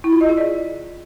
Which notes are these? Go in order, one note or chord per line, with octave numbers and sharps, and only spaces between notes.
E4
F4
D#5
G#4
D5